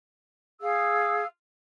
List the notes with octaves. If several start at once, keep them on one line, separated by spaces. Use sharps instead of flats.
G#4 F5 E6